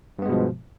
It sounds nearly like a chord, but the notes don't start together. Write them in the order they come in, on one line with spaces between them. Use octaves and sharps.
G2 B3 G#3 B2 F3